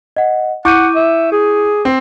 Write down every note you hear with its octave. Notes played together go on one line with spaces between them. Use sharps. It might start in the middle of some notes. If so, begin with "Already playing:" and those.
D#5 F#5
E4 F#5 C#6 D6 G6 D#7
E5
G#4
C4